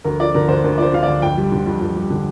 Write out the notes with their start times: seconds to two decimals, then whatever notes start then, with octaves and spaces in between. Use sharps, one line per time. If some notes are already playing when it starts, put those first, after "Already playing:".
0.04 D2 A#4
0.20 F3 D5
0.34 D3 A#4
0.48 D2 C5
0.63 D2 A#4
0.78 F3 C5 D5
0.94 D3 F5
1.03 D2 D5
1.22 F2 G5
1.37 G3
1.52 D3
1.66 F2
1.81 F2
1.96 G3
2.10 D3